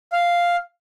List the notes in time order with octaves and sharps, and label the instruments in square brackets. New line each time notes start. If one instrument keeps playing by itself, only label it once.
[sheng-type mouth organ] F5